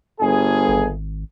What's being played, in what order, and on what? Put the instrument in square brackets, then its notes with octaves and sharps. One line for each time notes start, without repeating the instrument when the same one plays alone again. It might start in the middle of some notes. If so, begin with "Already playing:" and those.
[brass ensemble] G1 G#4
[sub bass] G#1